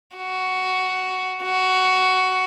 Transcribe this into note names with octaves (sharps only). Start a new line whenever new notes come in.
F#4
F#4